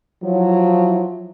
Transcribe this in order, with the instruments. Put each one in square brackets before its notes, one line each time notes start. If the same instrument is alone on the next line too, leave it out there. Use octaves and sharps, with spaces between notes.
[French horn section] F3 F#3 E4